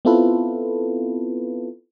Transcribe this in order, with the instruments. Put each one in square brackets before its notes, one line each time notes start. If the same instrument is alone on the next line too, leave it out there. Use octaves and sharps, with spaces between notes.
[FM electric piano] B3 C4 E4 F4 A4 B4